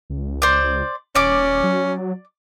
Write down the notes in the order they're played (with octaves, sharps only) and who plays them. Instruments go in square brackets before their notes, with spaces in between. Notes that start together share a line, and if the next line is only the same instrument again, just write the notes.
[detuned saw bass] C#2
[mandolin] C5 D5
[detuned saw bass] D#1 [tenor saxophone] C#4 [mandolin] D5 D6
[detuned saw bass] F#3